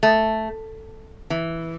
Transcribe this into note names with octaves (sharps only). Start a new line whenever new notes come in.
A3
E3